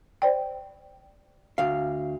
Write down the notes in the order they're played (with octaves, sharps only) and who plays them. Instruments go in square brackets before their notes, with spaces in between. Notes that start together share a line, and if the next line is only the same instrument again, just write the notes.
[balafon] C5 D5 G5
[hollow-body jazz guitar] D2 F5